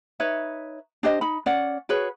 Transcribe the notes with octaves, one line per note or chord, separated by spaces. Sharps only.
D#4 B4 C#5 E5
D4 G4 C5 D#5
D#4 B5
C#4 D5 F#5
F#4 G#4 B4 C#5